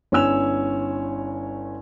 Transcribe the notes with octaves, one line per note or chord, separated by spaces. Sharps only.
G1 C#4 E4 G#5 E6 F7